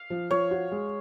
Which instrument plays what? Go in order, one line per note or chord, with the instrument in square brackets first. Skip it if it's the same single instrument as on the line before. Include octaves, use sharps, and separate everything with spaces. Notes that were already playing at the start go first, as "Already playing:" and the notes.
Already playing: [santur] F5
[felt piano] F3
[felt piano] F3 [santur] C#5
[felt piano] F#4
G#3